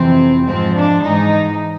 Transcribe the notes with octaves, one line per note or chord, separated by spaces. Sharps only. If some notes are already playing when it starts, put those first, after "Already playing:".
Already playing: F2 C3 E3 C4
G#2 F3 G#3 C4
D4
G#2 E3 G#3 D#4